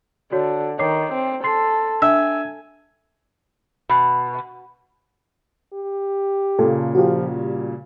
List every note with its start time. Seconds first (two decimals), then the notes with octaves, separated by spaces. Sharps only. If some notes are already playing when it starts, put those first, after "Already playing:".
0.32 D3 F#4 C#5
0.79 D#3 C#5 D6 C7
1.13 C4
1.44 A4 C6 C7
2.02 D4 E5 G#5
3.89 B2
5.73 G4
6.59 A#2 C#3 A4
6.95 F3 F#4 G4
7.36 G3